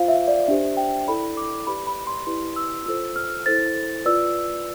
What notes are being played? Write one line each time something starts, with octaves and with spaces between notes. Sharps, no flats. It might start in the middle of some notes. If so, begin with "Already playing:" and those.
Already playing: F4 C5 F5
E5
D5
D4 G4 C5 E5
G5
E4 A4 D5 B5
D6
G4 B4 D5 B5
B5
C6
E4 G4 B4 D5 C6
E6
F4 A4 C5 E6
F6
E4 A4 C5 A6
F4 B4 D5 E6